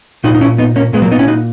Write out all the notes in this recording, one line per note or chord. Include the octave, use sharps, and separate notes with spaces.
A#2 D#4 F#4
D#4
C#4 E4
B3 D#4
A#3 C#4
A#2 G#3 B3
F#3 A#3
B3 D#4
C#4 E4
D#4 F#4